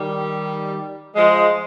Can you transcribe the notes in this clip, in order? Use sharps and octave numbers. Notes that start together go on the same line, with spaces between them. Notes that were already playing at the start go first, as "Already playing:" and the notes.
Already playing: D#3 G3
F3 G#3